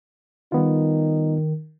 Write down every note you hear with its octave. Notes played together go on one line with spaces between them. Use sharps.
D#3 G3 B3 D#4 F4